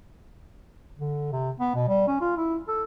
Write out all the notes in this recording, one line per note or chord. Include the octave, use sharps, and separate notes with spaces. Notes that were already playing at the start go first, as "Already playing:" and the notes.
D3
C3
B3
B2
G3
C#4
F4
E4
A4